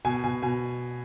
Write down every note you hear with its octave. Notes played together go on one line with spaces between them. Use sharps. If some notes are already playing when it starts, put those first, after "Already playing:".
B2 G#5
B2 G#5
B2 G#5